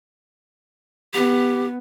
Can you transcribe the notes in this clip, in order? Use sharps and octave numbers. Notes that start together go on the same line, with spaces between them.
B3 G4